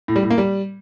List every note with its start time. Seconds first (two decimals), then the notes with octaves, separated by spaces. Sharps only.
0.08 A2
0.16 G3
0.23 A2
0.30 A#3
0.38 G3